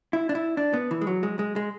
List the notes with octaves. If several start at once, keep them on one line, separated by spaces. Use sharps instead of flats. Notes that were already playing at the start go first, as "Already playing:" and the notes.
E4
D4
E4
D4
B3
E3
G#3
F#3
G#3
G#3
G#3